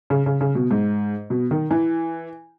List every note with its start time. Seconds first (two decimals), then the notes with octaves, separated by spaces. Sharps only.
0.10 C#3
0.26 C#3
0.41 C#3
0.55 B2
0.71 G#2
1.30 B2
1.51 D#3
1.71 E3